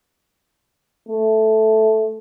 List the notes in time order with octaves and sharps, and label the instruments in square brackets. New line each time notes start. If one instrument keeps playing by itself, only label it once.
[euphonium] A3